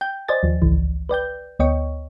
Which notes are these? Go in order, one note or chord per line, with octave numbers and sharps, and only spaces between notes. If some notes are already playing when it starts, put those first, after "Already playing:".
G5 G6
C5 D5 D#5 G#5 A6
D#2 F3
G#1 C#2 E3
B4 D5 G5 G6
D2 B3 C#5 D#5 G5 C#6